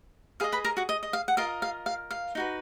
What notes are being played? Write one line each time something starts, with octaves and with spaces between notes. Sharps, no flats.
G#4 B4 D#5 F5
B4 B5
A#4 A#5
F#4 F#5
D#5
D#5
F5
F#5
F4 A#4 D#5 F5
F5
F5
F5
D#4 F#4 B4